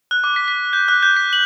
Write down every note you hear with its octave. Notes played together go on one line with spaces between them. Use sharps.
F#6
D6
B6
B6
G6
F#6
G6
B6
F#7